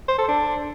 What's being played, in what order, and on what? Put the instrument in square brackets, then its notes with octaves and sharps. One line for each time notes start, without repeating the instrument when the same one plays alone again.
[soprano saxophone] C5
A4
D4